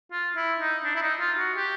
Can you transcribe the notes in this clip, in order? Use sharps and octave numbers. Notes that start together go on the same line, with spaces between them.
F4
E4
D#4
D4
E4
D#4
F4
F#4
G4